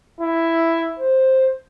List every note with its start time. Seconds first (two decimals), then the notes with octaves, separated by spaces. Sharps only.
0.21 E4
0.99 C5